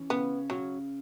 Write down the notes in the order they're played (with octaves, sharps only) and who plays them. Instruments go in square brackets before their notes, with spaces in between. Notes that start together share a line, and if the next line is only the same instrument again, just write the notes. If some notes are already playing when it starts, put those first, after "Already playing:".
Already playing: [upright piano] E3 C#4
[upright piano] C#3 [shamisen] B3
[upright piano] C#3 [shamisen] F#3